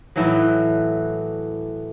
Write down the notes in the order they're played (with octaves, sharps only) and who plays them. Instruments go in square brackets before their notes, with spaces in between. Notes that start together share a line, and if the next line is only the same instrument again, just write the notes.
[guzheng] A2 E3 F#3